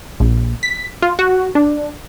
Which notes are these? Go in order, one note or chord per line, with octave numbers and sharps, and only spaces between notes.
A#1
B6
F4
F#4
D4